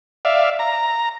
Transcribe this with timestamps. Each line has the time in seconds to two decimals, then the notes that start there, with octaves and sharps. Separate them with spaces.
0.25 D5 E5 F5
0.59 A#5